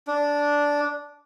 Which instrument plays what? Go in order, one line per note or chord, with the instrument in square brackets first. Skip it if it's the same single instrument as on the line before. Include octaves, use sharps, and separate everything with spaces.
[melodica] D4